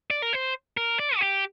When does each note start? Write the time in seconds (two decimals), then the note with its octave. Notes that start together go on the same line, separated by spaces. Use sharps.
0.10 D5
0.22 A#4
0.33 C5
0.77 A#4
0.99 D5
1.17 F#4
1.21 G4